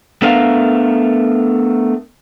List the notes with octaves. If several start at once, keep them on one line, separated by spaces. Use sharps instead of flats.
A3 B3 D4 A#4 B4 F5